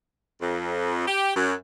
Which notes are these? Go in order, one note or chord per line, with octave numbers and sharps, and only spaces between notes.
F2
G4
F#2